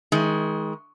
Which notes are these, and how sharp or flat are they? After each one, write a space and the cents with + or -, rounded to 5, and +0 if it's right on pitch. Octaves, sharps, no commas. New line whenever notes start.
D#3 +35 G#3 +10